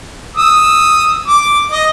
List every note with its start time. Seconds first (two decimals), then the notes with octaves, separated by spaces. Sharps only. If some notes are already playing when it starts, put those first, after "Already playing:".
0.36 D#6 E6
1.28 D6
1.72 D#5